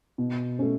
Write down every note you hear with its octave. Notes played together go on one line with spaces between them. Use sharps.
B2
A3 C#4